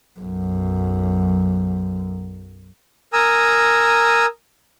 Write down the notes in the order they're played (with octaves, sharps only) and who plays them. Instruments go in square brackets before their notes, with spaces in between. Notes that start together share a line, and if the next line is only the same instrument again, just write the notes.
[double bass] B1 F#2
[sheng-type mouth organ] A#4 G#5 A#5 D#6 E6